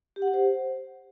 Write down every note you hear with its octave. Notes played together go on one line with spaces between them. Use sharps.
G4
F#5
G4
C5